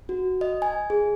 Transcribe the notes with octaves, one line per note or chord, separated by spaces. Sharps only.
F#4
D#5
G#5
G#4